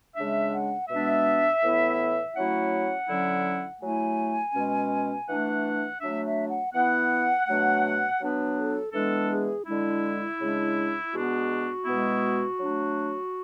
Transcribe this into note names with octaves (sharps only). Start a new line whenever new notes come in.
C#3 G#3 D4 E5
F#5
B2 G#3 B3 D4 E5
A2 E3 B3 E4
F#3 A3 C#4 E4 F#5
D3 F#3 C#4 E4
F#3 A3 E4 G#5
B2 G#3 C#4
E3 A3 D4 F#5
F#3 A3 D4 E5
E5
F#5
E3 B3 E4 F#5
B2 F#3 A3 D4
F#3 B3 D4 B4
A4
E3 G#3 B3 D4 A4
G#4
D3 G#3 D4 E4
C#3 G#3 D4
B2 G#3 B3 D4 F#4
B2 G#3 B3 E4
F#3 A3 D4